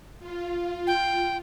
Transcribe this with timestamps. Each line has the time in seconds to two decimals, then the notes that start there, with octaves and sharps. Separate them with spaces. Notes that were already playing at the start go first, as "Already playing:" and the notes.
0.20 F4
0.87 G5